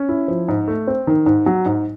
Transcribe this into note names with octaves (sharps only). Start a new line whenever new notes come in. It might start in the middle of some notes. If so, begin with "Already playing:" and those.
Already playing: C#4
E4
F3
G#2
A3
C4
D#3
G#2
F#3
G#2